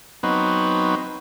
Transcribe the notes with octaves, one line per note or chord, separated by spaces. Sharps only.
F#3 B3 C4 D#4